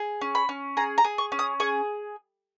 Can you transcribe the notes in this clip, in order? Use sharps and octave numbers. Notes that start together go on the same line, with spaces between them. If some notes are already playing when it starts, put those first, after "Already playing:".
Already playing: G#4
C#4
B5
C#4
G#4 A#5
A#5
G#4
C#6
C#4
D#6
G#4 C#6